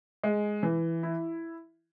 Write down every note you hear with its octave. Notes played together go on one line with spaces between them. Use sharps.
G#3
E3
E4